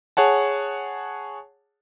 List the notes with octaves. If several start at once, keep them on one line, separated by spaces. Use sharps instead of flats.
G#4 C#5 F#5 A5